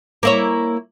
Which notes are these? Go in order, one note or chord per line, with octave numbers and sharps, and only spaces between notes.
A#3 E4 C#5